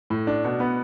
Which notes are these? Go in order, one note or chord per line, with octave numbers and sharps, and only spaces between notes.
A2
D4
B2
B3